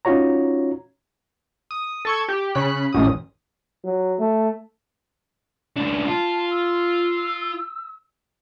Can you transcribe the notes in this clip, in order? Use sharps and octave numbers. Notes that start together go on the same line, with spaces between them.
C#4 D#4 F4 F#4 C#5 A#5
D#6
A4 C#6 G#6
G4
C#3 B5 F#6
A1 F#2 D#6
F#3
A3
C#2 D4
F4 A5
E6